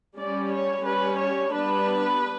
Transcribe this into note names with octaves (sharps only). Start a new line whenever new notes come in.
G3 C#4 D5
C#5
G3 C#4 B4
C#5
G3 B3 D4 B4